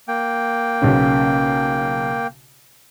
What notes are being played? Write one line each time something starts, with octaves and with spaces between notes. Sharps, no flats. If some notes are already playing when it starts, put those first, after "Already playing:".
A#3 G5
B1 C#3 C#4